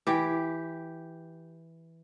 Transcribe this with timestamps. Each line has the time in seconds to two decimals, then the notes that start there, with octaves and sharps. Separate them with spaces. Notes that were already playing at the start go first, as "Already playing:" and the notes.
0.07 E3 G4